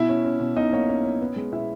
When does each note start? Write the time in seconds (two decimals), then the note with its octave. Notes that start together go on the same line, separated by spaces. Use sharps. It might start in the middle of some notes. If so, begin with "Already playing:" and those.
Already playing: B2 E4 E5
0.09 C#4
0.25 C#4
0.40 B2
0.56 B1 D#4 D#5
0.73 A#3 C#5
0.88 C#4 C#5
1.04 C#4
1.21 B3
1.36 G#3
1.52 B2 E4 E5